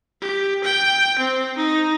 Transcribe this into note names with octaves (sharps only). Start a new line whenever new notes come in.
G4
G5
C4
D#4